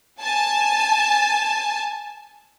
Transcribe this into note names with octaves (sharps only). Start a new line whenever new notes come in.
G#5 A5